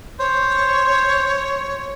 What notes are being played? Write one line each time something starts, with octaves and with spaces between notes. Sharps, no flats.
C5 C#5